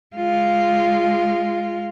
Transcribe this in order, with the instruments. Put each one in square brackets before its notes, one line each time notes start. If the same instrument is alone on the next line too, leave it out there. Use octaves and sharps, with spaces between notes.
[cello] G#3 F4